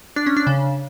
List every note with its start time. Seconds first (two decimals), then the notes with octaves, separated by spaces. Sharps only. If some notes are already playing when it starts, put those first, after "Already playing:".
0.16 D4
0.26 C#4
0.37 D4
0.47 C#3